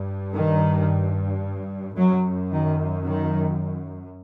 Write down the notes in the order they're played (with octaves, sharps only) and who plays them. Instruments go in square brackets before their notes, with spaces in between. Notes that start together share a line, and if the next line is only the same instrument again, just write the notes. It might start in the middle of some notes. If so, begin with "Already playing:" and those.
Already playing: [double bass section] G2
D#3
F#2 F#3
D#3
D#3